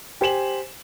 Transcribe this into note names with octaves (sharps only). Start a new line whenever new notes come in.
G4 C5 G#5 E7 F#7